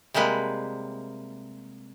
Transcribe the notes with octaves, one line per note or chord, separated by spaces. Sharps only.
C3 G3 G#3 A#3 B4